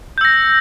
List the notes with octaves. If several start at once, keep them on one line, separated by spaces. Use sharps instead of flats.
E6 G6 A#6